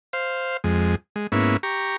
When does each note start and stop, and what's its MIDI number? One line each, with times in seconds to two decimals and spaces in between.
0.13 0.57 72
0.13 0.57 77
0.64 0.95 41
0.64 0.95 56
1.16 1.27 56
1.32 1.57 44
1.32 1.57 58
1.32 1.57 59
1.32 1.57 61
1.32 1.57 64
1.63 1.96 67
1.63 1.96 82
1.63 1.96 85